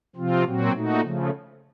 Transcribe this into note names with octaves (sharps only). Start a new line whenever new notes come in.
C3 F3 C4 F4
A#2 F#3 C4 F#4
A#2 A3 D#4 F#4
C#3 F3 A3